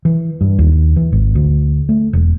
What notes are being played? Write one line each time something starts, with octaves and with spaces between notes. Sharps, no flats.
E3
G2
D#2
E3
G#1
D2
A3
E1